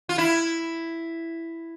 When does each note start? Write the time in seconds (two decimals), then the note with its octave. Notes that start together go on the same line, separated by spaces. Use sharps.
0.09 F4
0.18 E4